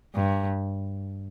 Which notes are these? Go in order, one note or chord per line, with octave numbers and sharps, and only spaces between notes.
G2